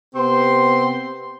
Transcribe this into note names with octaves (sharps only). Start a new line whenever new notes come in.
C3 B3 C4 C6